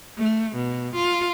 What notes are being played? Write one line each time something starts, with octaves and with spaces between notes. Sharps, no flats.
A3
B2
F4